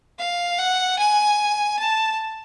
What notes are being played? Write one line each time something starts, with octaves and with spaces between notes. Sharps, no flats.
F5
F#5
G#5
A5